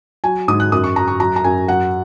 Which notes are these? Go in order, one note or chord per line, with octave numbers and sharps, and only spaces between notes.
F#3 G#5
G#2 D#6
F#6
F#2 D#6
C#6
F#3 A#5
C#6
F#3 A#5
A#5
F#2 G#5
F#3 F#5